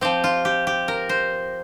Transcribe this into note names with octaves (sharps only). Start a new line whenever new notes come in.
F3 C4 G4
F4
G4
G4
A#4
C5